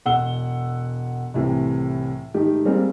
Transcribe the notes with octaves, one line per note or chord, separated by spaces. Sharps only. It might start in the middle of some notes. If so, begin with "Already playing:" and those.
E1 F#5 E6 G7
C2 A2 C3 E3
G#2 D#3 A3 G4
G3 G#3 A#3 C4 A#4